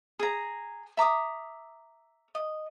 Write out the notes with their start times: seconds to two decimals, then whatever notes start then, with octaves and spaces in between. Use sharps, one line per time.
0.19 G#4 A#5
0.97 E5 A#5 D6 D#6
2.35 D#5